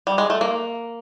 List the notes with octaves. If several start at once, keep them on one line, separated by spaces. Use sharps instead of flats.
G3
G#3
A3
A#3